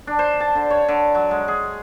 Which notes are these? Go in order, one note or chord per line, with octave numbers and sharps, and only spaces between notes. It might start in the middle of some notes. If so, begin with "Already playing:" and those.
D4
C5
A5
D3
C#5
D3
F#3
G#3
G#4